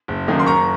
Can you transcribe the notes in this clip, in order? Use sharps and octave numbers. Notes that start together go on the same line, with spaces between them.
F#1
F#2 D#3 A#3
C6
F#1 A#5 C#6